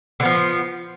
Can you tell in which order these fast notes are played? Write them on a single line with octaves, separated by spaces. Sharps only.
D3 B3 F3